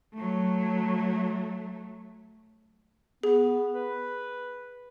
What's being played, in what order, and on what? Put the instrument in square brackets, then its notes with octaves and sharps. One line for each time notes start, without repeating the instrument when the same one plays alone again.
[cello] F#3 A3
[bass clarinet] B3 [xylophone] G#4
[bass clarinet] B4